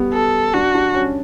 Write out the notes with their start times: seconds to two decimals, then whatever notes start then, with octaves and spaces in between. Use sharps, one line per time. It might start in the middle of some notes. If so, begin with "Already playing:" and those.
Already playing: G3 B3
0.13 A4
0.54 D4 F#4
0.75 D4
0.95 C#4